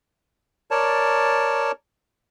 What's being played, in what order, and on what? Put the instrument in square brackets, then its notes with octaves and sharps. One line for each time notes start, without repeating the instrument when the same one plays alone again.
[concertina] A#4 C#5 D5 A5